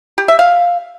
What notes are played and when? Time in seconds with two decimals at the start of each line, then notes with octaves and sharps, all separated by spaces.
0.18 G4
0.28 E5
0.39 F5